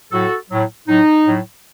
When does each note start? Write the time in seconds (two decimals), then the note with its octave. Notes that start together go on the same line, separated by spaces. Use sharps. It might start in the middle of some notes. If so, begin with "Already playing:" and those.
0.11 A2 F#3 F#4 A4
0.50 A2 F#3
0.88 A2 F#3 D#4
1.25 A2 F#3